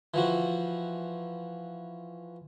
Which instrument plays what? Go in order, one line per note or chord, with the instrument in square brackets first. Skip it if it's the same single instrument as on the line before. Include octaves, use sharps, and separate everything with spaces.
[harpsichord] E3 F3 F#4